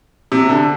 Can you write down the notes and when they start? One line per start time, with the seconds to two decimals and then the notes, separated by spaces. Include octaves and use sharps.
0.32 C3
0.49 D3